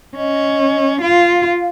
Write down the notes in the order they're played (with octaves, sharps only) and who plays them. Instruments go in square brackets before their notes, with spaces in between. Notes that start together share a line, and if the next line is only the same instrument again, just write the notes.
[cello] C#4 [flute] D#5
[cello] F4 [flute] F5